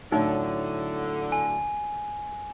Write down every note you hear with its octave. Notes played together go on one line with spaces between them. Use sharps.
A2 D3 F#3 D#4
G#5